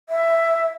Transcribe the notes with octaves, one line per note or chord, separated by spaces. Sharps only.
E5